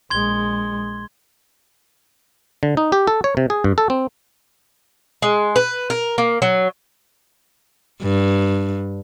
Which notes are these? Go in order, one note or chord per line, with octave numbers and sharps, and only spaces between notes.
A#1 G#3 C6 G#6 G7
D3
D#4
G4
A4
C#5
C3
G#4
G2
A4
C4
G#3
B4
A#4
A#3
F#3
G2